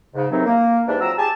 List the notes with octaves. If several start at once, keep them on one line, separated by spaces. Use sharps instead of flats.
G#2 C#3
D#2 C3 E3 F#3 C4 D#4
A#3
G#2 E3 G3 D4
F3 F#3 C4 A#5 E6
G4 G#4 G#5 A5